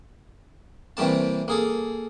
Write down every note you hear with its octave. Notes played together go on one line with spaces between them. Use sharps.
C3 E3 G3 A#3 A5
A#3 G#4 A4